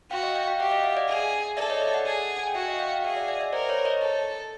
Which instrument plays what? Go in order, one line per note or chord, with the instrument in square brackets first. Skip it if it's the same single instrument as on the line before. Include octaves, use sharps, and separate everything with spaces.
[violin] F#4 [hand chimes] F5 G5
[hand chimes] D#5 F5
F5 G5
F5 G5
[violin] G4 [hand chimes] E5 F#5
[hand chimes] D#5 F5
D#5 F5
D5 E5
[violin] G#4
[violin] A4 [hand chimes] D5 E5
[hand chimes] C#5 D#5
D5 E5
E5 F#5
[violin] G#4
[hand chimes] G#5
G5
[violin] F#4 [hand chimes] E5 F#5
[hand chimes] D#5 F5
F5 G5
F5 G5
[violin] G#4 [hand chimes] E5 F#5
[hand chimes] D5 E5
D5 E5
D#5
D5 E5
[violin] A#4 [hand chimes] C5 D5
[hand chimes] B4 C#5
C#5 D#5
[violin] A4